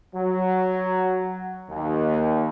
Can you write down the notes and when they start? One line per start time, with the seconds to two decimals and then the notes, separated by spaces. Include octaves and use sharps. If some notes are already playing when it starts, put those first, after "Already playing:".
0.15 F#3
1.69 D#2